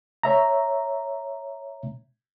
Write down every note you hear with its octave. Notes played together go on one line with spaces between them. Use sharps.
C#5 E5 A#5